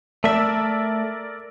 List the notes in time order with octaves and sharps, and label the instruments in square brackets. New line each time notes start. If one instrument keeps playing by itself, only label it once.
[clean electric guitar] A3 E5 [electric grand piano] A#4 D5 E6